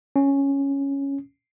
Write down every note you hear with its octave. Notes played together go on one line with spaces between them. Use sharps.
C#4